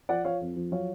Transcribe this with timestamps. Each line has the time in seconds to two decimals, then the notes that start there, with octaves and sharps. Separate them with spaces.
0.09 F3 D5 F#5
0.25 F3 C#5 F5
0.41 F2
0.56 F3
0.72 F#3 C#5 F5